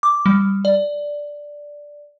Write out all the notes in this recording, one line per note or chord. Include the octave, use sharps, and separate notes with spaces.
D6
G3
D5